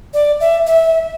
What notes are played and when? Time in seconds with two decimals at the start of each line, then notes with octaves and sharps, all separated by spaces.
0.14 D5
0.40 E5
0.67 E5